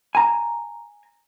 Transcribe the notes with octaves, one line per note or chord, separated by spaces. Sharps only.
G#5 A#5